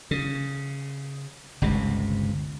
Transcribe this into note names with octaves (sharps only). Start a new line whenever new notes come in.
C#3
G1 C#2 C3